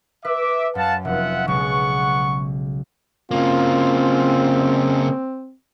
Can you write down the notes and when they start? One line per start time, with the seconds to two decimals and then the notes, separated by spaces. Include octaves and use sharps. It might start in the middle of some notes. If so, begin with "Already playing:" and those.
0.25 B4 E5 D6
0.75 F#2 F5 F#5 A5
1.05 F1 F4 E5 F#5
1.48 B1 C#3 G#3 B3 F#5 C#6
3.31 C#3 A#3 C4 F4